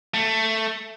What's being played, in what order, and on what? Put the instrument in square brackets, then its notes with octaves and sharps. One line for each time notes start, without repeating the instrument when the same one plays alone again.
[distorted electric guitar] A3